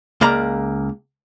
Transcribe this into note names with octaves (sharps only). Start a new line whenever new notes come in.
C#2 A#3 D5 A#5